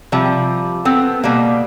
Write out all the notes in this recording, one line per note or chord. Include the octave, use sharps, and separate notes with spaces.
C3 F3 G3
B3 C4 A4
B2 G3 A#3